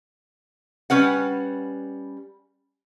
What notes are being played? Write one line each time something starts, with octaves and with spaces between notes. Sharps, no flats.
G3 C#4 B4 F#5